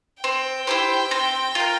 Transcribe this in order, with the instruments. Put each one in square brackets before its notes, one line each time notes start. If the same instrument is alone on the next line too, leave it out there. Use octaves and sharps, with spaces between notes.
[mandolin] C4 [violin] G5
[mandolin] E4 G4 C5
C4
F4 A#4